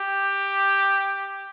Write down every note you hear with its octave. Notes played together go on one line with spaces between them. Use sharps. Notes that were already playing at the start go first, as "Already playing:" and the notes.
Already playing: G4